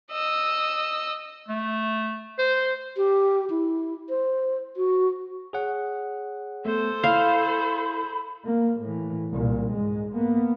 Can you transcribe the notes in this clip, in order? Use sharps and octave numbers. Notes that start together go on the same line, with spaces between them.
D#5 E6
A3
C5
G4
E4
C5
F#4
G#4 C#5 F#5
A3 B3 A4 C5
E4 F5 B5
A#3
A2 E3
C2 A#2
G#2 G#3
A#3 B3